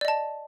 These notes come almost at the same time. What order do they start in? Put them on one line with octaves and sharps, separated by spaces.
D5 D#5 A5